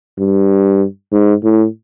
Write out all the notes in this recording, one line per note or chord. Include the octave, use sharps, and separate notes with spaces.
G2
G#2
A2